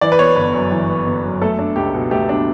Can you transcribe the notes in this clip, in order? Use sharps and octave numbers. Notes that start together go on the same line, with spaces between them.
E3 D5
B4
B3 C#5
G1 B4
F#2
E3
B3
G1
F#2
A3 A4
D4
C#2 G4
B2
A3 G4
D4